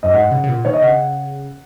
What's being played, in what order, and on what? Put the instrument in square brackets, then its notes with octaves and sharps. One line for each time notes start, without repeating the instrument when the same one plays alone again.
[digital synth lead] F#2 [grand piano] D#5
[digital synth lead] G#2 [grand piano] F#5
[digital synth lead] C#3
C#3
A#2
[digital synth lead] D#3 [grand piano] C#5
[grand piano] D#5
[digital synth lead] C#3 [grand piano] F#5